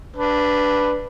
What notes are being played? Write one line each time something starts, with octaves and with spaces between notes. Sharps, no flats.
D4 B4